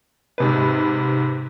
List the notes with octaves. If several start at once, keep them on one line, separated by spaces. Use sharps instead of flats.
G#2 C3 B4